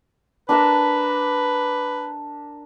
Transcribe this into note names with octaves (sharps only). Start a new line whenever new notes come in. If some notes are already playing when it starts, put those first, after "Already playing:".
D4 A#4 B4 E5